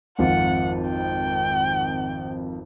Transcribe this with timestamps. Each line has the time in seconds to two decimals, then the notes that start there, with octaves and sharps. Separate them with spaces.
0.19 G#1 F2 F4 F#5
0.89 G5